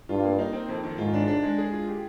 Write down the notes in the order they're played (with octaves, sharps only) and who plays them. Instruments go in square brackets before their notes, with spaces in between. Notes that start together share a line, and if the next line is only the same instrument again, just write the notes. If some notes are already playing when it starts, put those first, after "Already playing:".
[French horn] G2 [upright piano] F4
[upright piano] A#3
D#4
C4
F2
D#3
[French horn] G#2 [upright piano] F4
[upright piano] D4
D4
G#3
G#4
F4
G4